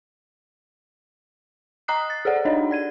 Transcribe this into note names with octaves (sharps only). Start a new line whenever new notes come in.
D#5 A#5 D#6 F#6 C7
A6
G#4 A4 D5 F#5
D4 D#4 C#5 D#5
D5 G#6 D#7